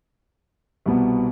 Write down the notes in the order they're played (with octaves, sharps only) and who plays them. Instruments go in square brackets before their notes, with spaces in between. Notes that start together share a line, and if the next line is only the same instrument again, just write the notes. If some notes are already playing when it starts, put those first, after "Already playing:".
[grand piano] C2 B2 B3